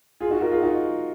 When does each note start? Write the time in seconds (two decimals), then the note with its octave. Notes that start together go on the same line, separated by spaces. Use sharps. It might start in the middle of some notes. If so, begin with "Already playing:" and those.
0.20 F4 G#4
0.30 D#4 F#4
0.41 F#4 A#4
0.51 F4 G#4
0.62 D#4 F#4